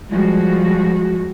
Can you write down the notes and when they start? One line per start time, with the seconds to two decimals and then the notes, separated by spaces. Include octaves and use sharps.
0.11 F3 G3 G#3 F#4